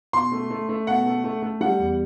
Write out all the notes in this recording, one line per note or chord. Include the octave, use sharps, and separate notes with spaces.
B2 C6
A3
A3
A3
B2 F#5
A3
A3
A3
G3 F#5
E2